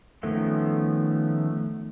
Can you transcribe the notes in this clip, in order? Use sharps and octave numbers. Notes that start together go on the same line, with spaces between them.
D#3 F3 A3 B3 C#4